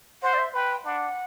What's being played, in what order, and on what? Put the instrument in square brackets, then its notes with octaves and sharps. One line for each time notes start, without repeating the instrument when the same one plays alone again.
[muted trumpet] C5 [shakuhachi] F#5
[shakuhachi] D5
E5
[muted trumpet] B4 [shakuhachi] G5
[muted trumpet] D4 [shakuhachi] F#5